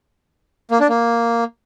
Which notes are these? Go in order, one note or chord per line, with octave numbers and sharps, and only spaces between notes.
A#3
D4
A#3